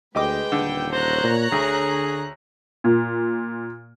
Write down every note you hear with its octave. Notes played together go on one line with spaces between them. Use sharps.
D2 G#3 G4 B4 D#5 G5 D6
D#1 D3
C5 C#5 A#5 F#6
A#2
D2 D3 G#4
A#2